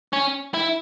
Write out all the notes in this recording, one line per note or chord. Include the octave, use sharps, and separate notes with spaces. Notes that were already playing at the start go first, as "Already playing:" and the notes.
C#4
E4